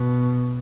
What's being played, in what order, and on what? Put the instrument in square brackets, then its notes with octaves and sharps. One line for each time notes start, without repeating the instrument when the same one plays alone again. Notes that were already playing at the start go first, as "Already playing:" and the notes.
Already playing: [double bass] B2